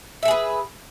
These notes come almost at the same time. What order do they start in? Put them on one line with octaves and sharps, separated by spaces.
E5 A4 G#4 B4